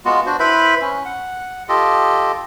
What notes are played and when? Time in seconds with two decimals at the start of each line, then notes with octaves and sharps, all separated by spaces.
0.05 G#3 B3 F4 F#4
0.26 D4 F#4 C5
0.39 E4 B4 C5 B5
0.82 C#4
1.05 F#5
1.69 F4 G4 A4 D#5